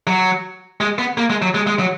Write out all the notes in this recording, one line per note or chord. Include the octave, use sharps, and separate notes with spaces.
F#3
G#3
B3
A#3
G#3
F#3
G#3
G#3
F#3